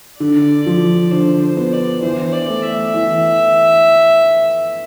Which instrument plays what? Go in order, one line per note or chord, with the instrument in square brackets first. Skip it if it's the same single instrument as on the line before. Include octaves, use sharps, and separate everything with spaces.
[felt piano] D3 [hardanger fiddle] D5
[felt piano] F3
[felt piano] D3 [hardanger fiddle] C5
[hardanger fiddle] C5
[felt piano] B3
[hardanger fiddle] D5
[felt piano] E3 [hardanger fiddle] C5
[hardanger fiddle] D5
[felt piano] A3
[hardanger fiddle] E5
[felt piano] E3